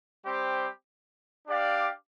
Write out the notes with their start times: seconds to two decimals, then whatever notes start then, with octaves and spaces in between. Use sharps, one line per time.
0.25 G3 C4 G4 C5
1.46 D4 G4 D5 F5